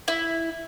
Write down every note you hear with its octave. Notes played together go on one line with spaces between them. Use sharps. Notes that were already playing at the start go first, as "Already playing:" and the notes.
E4